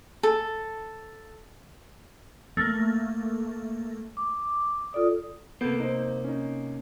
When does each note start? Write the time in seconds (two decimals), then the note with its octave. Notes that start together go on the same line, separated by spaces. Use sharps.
0.23 A4
2.57 A3 A#3
4.17 D6
4.93 F4 A4 D5 D#6
5.61 C3 A#3 B3 A4 G6
5.80 D#4 C5
6.24 C#4 D#4